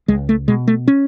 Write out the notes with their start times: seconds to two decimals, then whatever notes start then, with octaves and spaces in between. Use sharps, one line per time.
0.08 C#2 G#3
0.29 A3
0.48 B2 G#3
0.68 A3
0.88 C#4